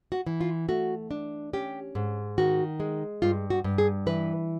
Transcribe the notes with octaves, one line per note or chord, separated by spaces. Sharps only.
F#4
E3
F4
A3 F#4
D4
C#4 G4
G#2
D#3 F#4
G#3
G2 F4
F#4
G2
G#4
E3 B4